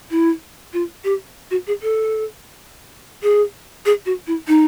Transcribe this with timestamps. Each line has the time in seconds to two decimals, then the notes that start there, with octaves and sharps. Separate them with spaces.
0.11 E4
0.73 F4
1.04 G4
1.51 F#4
1.67 G#4
1.82 A4
3.23 G#4
3.86 G#4
4.06 F#4
4.27 E4
4.48 D#4